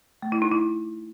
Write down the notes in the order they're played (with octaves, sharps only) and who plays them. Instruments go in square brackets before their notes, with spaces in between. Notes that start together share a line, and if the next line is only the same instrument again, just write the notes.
[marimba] A3
E4
D#4
E4